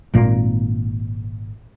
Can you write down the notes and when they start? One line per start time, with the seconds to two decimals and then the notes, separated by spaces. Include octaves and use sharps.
0.14 G#1 A#2 A#3